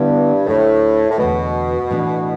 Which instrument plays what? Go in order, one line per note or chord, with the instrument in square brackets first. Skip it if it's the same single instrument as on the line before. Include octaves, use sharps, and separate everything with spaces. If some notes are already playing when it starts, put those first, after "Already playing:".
Already playing: [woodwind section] G2 [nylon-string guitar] D3 G3 B3 E4
[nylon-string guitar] D2 D3 A3 D4 [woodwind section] A2
[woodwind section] A2
[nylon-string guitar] E2 D3 A3 [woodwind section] B2
[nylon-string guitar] A2 E3 A3 D4